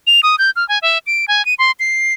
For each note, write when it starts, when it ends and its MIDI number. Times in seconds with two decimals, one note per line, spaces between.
0.07 0.21 101
0.23 0.36 87
0.38 0.50 91
0.56 0.67 89
0.69 0.79 80
0.82 0.98 76
1.06 1.25 98
1.28 1.45 80
1.45 1.54 99
1.59 1.71 84
1.80 2.13 96